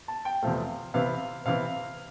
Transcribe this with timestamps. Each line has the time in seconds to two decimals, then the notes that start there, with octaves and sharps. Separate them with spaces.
0.08 A5
0.25 G5
0.43 E2 C3 F3 A3 F5
0.94 C3 E3 B3 F5
1.45 C3 E3 B3 F5